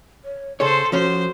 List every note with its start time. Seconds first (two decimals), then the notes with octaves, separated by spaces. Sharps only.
0.25 C#5
0.60 C#3 G#4 A4 C5 C#5 C6
0.92 F3 C#4 F#4 C5